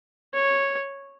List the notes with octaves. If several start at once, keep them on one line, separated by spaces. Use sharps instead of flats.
C#5